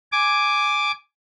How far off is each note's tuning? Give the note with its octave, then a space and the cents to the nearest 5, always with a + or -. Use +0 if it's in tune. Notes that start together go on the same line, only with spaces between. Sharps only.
G#5 +0 D6 +0